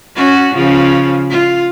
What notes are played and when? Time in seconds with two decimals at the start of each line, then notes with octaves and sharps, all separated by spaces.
0.16 C#4 F#4
0.55 C#3 F3
1.30 F4